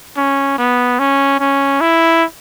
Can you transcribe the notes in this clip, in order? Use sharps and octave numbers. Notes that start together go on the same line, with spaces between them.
C#4
B3
C#4
C#4
E4